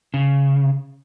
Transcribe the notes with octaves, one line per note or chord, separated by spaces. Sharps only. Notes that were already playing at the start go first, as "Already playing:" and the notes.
C#3